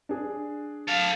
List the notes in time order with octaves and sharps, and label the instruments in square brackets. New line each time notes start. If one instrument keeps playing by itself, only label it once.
[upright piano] D4 G#4
[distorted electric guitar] A4 F5